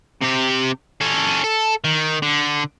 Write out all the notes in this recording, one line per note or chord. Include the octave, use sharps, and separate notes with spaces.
C3 G4
C#4 A4
A4
D#3
D3